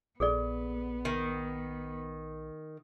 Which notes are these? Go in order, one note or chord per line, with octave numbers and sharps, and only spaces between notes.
A#1 B3 G#4 A4 D5
D#3